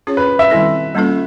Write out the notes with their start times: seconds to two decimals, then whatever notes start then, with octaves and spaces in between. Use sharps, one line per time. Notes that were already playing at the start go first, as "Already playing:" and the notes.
0.07 C#4 F4 G#4 C#5
0.17 B4
0.39 E5
0.50 D#3 G3 C4 E4 A4
0.95 G3 A#3 C#4 F4 A4